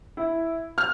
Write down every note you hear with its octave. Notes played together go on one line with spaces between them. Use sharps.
E4
F6